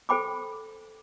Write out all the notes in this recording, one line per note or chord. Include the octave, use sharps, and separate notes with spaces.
A4 C5 G5 B5 D6